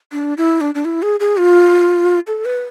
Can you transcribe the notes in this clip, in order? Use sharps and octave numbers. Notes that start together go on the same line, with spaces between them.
D4
E4
D4
D4
E4
G#4
G#4
F4
A4
B4